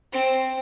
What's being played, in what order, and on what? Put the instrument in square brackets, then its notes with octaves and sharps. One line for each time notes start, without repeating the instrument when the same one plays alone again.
[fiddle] C4